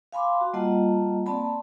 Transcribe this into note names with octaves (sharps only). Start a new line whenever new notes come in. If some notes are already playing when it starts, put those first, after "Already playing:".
F5 G#5 B5 C6 D6
F#4
G3 A#3 F4 D#5 F#5 A5
A#3 C4 D5 A5 B5